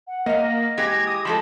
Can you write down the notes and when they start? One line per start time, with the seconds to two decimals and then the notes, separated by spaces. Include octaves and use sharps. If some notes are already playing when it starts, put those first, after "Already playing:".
0.08 F#5
0.26 A#3 D#5 F5
0.44 A#6
0.78 E3 G#3 G4 G#6 A#6
1.07 D#6
1.25 F3 G#3 A4 B5 D#6